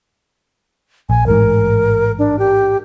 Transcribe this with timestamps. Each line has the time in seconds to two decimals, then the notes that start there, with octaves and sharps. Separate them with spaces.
1.10 A#1 G#5
1.26 A1 G#2 A#4
2.19 D4
2.39 G4